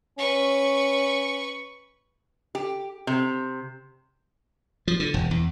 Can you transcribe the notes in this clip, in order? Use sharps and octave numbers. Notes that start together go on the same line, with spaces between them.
C#4 B4 C#6
G4
C3
F3
D3
E1
E2